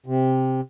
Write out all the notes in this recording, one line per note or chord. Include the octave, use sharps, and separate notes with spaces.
C3